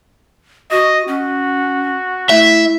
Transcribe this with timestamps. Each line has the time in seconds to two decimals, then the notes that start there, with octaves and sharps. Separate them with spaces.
0.71 F#4 D#5
1.08 C#4 F#4
2.29 A3 E4 E5